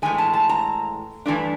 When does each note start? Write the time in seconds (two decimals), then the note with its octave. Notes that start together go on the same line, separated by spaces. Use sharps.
0.02 A2 E3 G#3 G#5
0.18 A5
0.33 A5
0.49 A#5
1.26 G2 E3 A3 D4